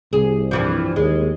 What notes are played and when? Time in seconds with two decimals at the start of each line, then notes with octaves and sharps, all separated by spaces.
0.13 C2 G#4
0.51 G2 E3 F3
0.96 D#2 G#3